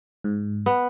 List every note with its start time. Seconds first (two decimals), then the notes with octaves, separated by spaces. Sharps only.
0.24 G#2
0.66 B3